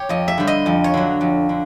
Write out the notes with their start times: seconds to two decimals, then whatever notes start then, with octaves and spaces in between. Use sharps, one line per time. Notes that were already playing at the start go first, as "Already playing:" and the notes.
Already playing: G4 C#5
0.09 F2 D#5
0.28 E5
0.38 D3 G3
0.47 D#5
0.66 F2
0.84 C#5
0.94 D3 F#3
1.21 F2
1.49 D3